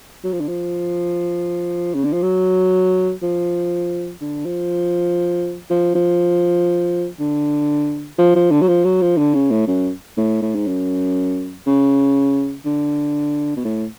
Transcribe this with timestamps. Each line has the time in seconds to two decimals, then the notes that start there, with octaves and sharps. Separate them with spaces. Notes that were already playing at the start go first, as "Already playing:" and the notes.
0.24 F#3
0.33 F3
0.40 D3
0.48 F3
1.94 C#3
2.04 D3
2.13 F3
2.22 F#3
3.22 F3
4.21 D3
4.46 F3
5.70 F3
5.95 F3
7.20 D3
8.18 F3
8.35 F3
8.52 D3
8.61 F#3
8.68 F3
8.85 F#3
9.02 F3
9.18 D3
9.34 C#3
9.51 A2
9.67 F#2
10.17 A2
10.42 A2
10.55 G#2
10.67 F#2
11.67 C#3
12.65 D3
13.57 B2
13.65 A2